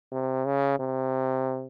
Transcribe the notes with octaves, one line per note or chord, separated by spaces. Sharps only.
C3
C#3
C3